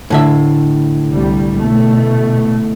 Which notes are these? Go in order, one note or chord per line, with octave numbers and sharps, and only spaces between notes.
A2 D3 E5
C2 G3
B2 A3